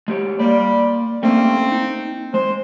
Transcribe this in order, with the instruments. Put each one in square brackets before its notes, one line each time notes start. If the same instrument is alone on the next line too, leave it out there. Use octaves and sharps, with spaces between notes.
[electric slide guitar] G#3 G4 C#5
[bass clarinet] G3 [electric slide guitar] A#3 D5
[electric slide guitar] A3 A#3 C#4 [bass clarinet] C4
[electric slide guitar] D#4
[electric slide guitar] G#3 [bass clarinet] C5